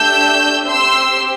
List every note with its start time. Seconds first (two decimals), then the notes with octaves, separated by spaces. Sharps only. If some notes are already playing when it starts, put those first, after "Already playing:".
Already playing: A3 D4 G4 E6 G6
0.66 C4 G4 C6 E6